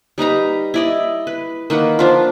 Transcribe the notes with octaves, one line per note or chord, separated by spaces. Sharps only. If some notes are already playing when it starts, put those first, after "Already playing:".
G3 D#4 B4 A#5
E4 D5 D#5
B4
D#3 A#3 B4 F#5
F3 D4 F4